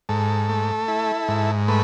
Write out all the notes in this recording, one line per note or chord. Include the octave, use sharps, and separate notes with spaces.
G#2 A4
A3
E4
G#2
A3 B4